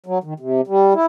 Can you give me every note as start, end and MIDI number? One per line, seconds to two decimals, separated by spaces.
0.06 0.18 54
0.24 0.34 51
0.40 0.61 48
0.67 0.93 55
0.94 1.06 64